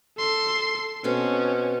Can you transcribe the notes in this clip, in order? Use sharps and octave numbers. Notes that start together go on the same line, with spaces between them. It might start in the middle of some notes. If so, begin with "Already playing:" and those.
A4 C6
B2 C4 C#4 A4